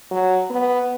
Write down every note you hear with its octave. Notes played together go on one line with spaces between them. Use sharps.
F#3
B3